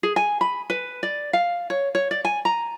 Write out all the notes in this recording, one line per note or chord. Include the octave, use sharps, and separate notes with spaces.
G#4
G#5
B5
B4
D5
F5
C#5
C#5
D5
G#5
A#5